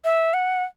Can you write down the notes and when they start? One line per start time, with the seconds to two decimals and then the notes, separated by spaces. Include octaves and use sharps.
0.04 E5
0.34 F#5